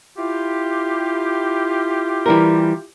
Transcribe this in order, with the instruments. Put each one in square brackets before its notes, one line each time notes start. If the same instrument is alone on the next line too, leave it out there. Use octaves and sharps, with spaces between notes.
[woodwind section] E4 F4 G4
[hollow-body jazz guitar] E3 G3 A#4